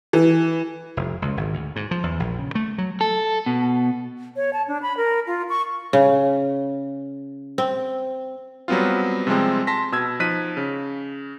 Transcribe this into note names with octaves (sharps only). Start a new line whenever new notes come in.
E3
F1
C#2
G#1
D2
G#2
F3
E2
A#1
C#3
A3
F#3
A4
B2
C#5
A5
D4
B5
A#4
F4
C#6
C#3
C4
F#3 G3 B3 C4 F4
C3 F3 G3 G#3 C4
A5 C6 A#6 B6
B2 E6 G#6
F3 D#4 F#6 B6 D#7
C#3